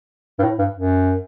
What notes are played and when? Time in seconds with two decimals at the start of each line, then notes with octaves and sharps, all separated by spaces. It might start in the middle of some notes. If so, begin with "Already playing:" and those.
0.39 G2
0.43 A2
0.59 G2
0.75 F#2